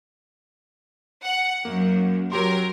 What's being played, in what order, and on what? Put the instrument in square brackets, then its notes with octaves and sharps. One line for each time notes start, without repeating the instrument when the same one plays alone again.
[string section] F#5
[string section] F#2 [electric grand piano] A#3
[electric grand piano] F#3 G4 C6 [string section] A#4